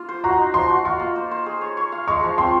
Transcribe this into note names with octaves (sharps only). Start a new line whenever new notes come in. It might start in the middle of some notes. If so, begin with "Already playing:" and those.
Already playing: A#3 F4
C5
F#4 A#5
D#4
F3 C6
F#4
F4 C#6
A#3
C5
C5
G#4
C#5
C#5
F5
G#3 C#6
F3
C4 C6